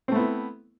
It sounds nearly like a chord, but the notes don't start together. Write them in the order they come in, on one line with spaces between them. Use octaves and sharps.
C4 A3 B3 E4